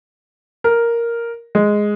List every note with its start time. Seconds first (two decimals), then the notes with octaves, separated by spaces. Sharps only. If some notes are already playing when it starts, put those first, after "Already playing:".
0.64 A#4
1.55 G#3